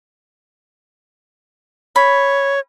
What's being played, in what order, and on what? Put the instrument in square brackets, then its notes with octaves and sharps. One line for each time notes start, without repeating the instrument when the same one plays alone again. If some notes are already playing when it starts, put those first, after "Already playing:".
[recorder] C#5 [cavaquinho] B5